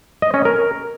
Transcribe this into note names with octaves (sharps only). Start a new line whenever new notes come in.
D#5
C#4
A#4